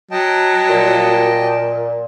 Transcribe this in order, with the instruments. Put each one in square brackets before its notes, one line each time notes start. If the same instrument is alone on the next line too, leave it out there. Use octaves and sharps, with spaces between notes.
[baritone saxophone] F#3 [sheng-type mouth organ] D#5 G5 A5
[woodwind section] A#2